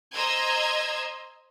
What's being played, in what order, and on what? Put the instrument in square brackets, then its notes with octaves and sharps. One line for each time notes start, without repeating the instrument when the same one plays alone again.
[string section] C5 D#5 A#5 C6 E6 G#6